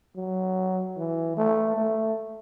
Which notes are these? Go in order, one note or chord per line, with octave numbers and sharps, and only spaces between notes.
F#3
E3
A3
A3